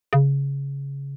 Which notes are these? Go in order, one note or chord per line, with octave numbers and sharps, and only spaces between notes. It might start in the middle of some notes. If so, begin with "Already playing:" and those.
C#3